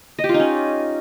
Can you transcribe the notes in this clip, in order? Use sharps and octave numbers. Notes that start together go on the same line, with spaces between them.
D#5
G4
F4
D#4
C#4